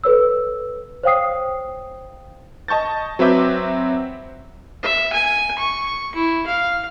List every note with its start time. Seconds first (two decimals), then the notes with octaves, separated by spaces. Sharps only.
0.04 A4 B4 C#5 E6
1.03 C5 C#5 F5 G5 D#6 C7
2.68 D#5 A5 C#6 G6 A6
3.19 F#3 C4 B4 E5 D6 G6
4.83 E5
5.12 G#5
5.58 C#6
6.14 E4
6.46 F5